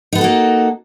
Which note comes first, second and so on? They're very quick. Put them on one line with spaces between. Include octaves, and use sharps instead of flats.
D#4 B3 A4 F#4 A#3